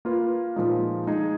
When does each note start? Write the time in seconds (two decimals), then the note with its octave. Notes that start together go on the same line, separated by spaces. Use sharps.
0.05 A#3 F4 B4
0.56 A#2 F3 G#3 D#4
1.07 G#3 D#4 G#4